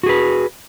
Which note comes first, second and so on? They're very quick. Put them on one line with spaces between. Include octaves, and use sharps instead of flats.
F#4 G#4 B4